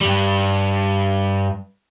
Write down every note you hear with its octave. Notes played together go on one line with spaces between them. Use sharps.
G2 G3